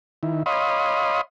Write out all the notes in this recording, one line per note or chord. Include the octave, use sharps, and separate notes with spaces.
D#3 E4
C#5 D#5 F5 B5 C6 D#6